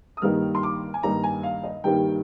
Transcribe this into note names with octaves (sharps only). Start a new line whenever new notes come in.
D#6
G2 D#3 G3 A#3 D#4 F6
C6
D6
G#5
G2 D#3 G3 A#3 D#4 A#5
G#5
F5
D#5
G2 D#3 G3 A#3 D#4 G5